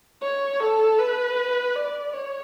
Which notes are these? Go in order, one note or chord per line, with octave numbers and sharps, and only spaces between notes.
C#5
A4
B4
D5
C#5